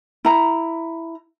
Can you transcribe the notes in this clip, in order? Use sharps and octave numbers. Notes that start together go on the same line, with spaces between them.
E4 A#5